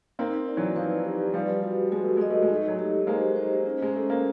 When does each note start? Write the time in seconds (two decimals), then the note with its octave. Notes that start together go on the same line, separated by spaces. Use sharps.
0.19 A#3 C4 D#4
0.48 D5
0.57 E3 F#3
0.76 F3 B4
1.05 G4
1.34 F3 G3 B4
1.63 F#4
1.92 G#3 F#4
2.04 A3
2.17 G#3 D#5
2.30 A3
2.42 G#3
2.50 D#4
2.56 A3
2.68 F#3 G#3
2.79 G4
3.07 G#3 A#3 C5
3.36 C5
3.66 C#4
3.82 G#3
3.93 A3 C#4
4.10 A#3